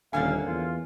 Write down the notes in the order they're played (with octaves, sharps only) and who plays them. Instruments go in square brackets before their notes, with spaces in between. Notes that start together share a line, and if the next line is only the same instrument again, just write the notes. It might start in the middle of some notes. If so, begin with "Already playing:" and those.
[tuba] D#1 [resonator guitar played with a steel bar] D3 A#3 C#4 [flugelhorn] F5 [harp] G#5 A6
[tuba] E2 [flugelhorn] F4